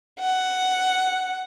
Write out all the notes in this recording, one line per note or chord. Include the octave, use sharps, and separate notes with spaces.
F#5